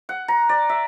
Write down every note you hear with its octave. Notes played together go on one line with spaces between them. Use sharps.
F#5
A#5
D5
E5